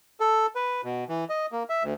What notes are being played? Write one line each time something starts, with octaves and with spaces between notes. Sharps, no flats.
A4
B4
B2
E3
D#5
A#3
E5
D2